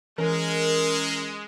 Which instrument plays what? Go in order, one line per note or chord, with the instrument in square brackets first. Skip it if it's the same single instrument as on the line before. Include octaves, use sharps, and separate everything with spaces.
[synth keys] E3 C#4 [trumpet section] G#3 [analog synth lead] A#4